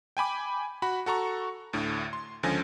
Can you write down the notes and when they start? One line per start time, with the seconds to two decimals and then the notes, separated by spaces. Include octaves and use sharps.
0.17 G5 G#5 B5 D6
0.82 F#4 B5
1.06 F#4 A4 A#5 C#6
1.73 D2 A2 D3
2.13 C6
2.43 C#2 D3 F3 C#4 G#5 A#6